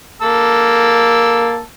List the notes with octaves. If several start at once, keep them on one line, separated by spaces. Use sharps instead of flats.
A#3 A5 E6